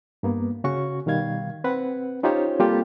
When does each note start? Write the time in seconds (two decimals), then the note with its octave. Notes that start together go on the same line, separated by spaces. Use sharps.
0.23 G2 A#3 B3
0.64 C#3 C#4 F#4 C#6
1.06 B2 D#3 G3 F5 G#6
1.64 C4 B4 F#5
2.23 C#4 D#4 F4 G4 C5 C#5
2.60 G3 A#3 C4 F4 G4 A4